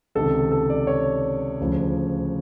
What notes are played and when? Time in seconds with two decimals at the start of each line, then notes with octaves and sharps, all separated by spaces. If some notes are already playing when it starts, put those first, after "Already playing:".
0.15 C#2 C3 D#3 A4
0.52 A4
0.70 D5
0.87 C#5
1.60 D2 C#3 F3